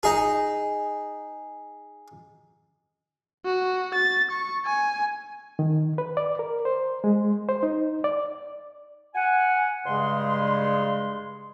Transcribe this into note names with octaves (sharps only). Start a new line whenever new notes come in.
D#4 G#4
F#4
A6
C#6
G#5
D#3
B4
D5
A#4
C5
G#3
C5
D#4
D5
F#5 G#5
G2 C#3 G#3 C6